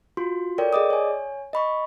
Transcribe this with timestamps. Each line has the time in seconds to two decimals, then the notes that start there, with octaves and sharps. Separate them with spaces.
0.17 F4 F#4 C6
0.58 A4 A#4 C#5 D5 G5
0.73 G#4 D5 D#5 D6 D#6
0.90 C#5 G#5
1.53 D#5 B5 C#6